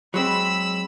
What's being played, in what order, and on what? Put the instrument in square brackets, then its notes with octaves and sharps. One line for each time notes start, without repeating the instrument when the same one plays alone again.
[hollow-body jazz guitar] F#3 G#3 C4 [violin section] B5 E6